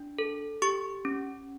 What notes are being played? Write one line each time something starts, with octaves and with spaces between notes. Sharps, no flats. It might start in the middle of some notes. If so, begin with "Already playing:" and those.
Already playing: D4
A4
G4 C#6
C#4